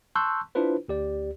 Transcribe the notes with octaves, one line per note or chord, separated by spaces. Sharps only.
A5 C6 C#6 E6 F#6 G6
D4 E4 F4 B4 C5
D2 G4 D5